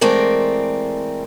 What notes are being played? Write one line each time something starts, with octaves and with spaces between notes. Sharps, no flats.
E3 G#3 A3 C4 A#4 D5